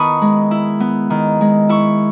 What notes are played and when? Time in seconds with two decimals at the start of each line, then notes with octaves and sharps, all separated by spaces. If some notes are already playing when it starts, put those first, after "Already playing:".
Already playing: D#3 B3 E4 A5 B5 C#6 D#6
0.21 G#3
0.51 E4
0.80 B3
1.10 D#3
1.41 G#3
1.69 E4 C#6